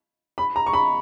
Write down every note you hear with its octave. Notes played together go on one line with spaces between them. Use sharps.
B5
A#5
C#6
B5